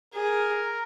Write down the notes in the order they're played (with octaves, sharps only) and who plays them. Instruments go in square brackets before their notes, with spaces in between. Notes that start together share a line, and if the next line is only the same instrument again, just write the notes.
[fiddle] G#4 [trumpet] A#4